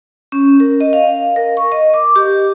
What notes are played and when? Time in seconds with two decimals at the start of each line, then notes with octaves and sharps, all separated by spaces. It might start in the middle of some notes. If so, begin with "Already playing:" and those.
0.32 C#4
0.60 A#4
0.80 D#5
0.93 F5
1.36 A#4
1.57 C#6
1.72 D#5
1.94 D6
2.16 G4